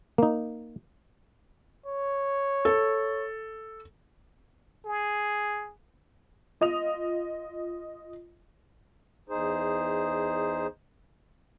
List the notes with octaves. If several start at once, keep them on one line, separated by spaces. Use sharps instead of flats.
A#3 D#4
C#5
A4
G#4
F4 D#5 D#6 F7
E2 D#4 G#4 C5